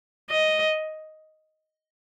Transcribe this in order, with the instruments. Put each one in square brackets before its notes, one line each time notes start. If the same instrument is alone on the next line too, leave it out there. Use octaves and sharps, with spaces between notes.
[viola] D#5